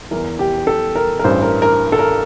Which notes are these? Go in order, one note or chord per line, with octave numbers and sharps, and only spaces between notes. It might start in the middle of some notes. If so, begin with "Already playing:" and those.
E2 E3 A#4
G4
A4
A#4
A#4
A1 G2 E3 C5
A#4
A#4
A4
A#4